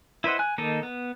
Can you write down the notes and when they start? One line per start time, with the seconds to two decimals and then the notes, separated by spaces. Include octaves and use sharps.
0.24 E4 B4 C5 D#5 F#5
0.39 G#5 F#6
0.58 D#3 A#3 D#4 A4 D#5
0.83 B3